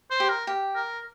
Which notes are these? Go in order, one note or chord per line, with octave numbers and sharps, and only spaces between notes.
C5
G4
A#4
G4
A#4